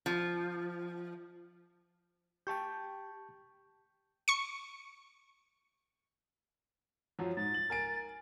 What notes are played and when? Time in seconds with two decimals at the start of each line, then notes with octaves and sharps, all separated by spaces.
0.06 F3
2.47 G4 G5 A5 C#6 G6
4.28 C#6 C#7
7.19 F#2 F3 F#3
7.37 G#2 A6
7.54 F#7
7.70 A#4 G#5 D7